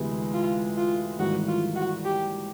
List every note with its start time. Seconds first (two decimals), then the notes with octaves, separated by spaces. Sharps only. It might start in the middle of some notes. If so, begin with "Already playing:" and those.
Already playing: D2 C3 E3 G#3 B3
0.34 F4
0.77 F4
1.19 G#1 G#2 E3 G3 A#3 F#4
1.48 F4
1.76 F#4
2.05 G4